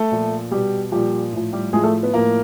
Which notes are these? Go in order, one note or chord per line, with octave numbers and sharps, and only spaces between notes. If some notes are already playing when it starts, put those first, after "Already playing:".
Already playing: A3 A4
A#2 F3
B2 G3 G4
A#2 F3 G3 G4
A2 F3
G3 G4
A2 F3 G#3 G#4
A3 A4
B3 B4
A2 F3 A#3 A#4